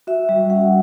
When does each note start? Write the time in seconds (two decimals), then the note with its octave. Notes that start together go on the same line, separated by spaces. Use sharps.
0.07 F#4 E5
0.29 G3
0.50 C#4 F#5